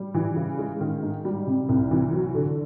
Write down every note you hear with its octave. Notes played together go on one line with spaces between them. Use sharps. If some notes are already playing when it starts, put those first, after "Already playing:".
Already playing: G3
E3
C#3
G#3
D#3
G#2
G3
C3
C2
E3
F#3
D3